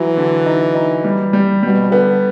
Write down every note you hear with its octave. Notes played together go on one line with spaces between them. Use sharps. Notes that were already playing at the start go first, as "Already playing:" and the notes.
Already playing: E3 F#3
D3
D#4
D#4
G3
G3
B2 G3
D3 B3